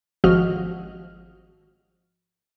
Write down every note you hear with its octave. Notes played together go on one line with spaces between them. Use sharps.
G#1 F3 F#4 D#5 F6